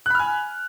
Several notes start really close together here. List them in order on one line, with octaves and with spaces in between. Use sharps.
F#6 B5 F6 G#5